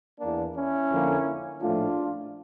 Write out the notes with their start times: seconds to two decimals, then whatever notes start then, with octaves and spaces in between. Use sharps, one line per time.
0.20 E2 E3 A#3 D4
0.55 C#4 E4
0.91 F2 D3 F3 A#3
1.62 A#1 A2 F3 A3 D4 F4